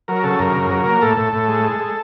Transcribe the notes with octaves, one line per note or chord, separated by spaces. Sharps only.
F#3 A#4
C#3 A4
F#2 A#4
C#3
F#3 A#4
A#3
A2 A4
A2
A2
G#3
G#3
G#3